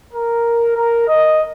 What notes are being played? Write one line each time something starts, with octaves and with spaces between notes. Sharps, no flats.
A#4
A#4
D#5